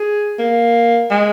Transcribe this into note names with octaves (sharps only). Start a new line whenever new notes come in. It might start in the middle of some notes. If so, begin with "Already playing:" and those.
Already playing: G#4
A#3
G#3